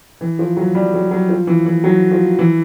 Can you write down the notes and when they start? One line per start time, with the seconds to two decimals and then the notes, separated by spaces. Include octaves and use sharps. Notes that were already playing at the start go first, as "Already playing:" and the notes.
0.21 E3
0.39 F3
0.57 F#3
0.75 G3
0.94 F#3
1.11 F#3
1.29 F3
1.47 E3
1.66 E3
1.84 F#3
2.11 F3
2.39 E3